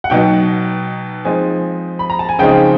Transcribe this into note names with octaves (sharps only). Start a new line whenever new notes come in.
F#5
B2 F#3 B3 D#4 G5
F3 G#3 C4 D#4 G#5
B5
A#5
A5
G#5
C#3 F3 G#3 C4 D#4 G5